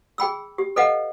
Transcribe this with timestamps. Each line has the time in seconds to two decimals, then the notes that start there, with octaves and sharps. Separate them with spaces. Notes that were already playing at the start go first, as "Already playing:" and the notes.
0.18 G#4 G5 B5 E6
0.58 G4
0.76 A4 B4 D#5 F5 F#5